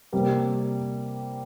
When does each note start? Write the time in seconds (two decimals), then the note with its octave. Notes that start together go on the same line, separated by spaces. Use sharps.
0.12 C3 G3 A#3